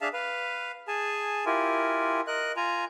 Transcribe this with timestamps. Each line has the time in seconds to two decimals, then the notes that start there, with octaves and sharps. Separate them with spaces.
0.01 D4 G#4 E5 F5 A5
0.13 B4 F5
0.88 G#4 G#5 A5
1.46 E4 F4 G4 A#4 G#5
2.27 A#4 D#5 F#6
2.56 F4 G#5 A#5